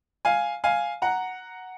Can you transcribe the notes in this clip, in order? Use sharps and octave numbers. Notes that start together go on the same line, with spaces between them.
F5 G#5
F5 G#5
F#5 A#5